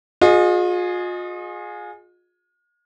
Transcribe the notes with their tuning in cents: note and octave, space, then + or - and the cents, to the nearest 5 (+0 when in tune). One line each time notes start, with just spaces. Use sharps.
F4 +40 G#4 +5 D#5 -15